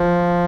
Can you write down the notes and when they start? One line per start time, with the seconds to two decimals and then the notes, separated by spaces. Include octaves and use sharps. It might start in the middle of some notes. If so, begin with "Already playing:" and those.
Already playing: F3